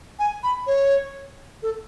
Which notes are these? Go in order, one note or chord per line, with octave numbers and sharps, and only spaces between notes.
G#5
B5
C#5
A4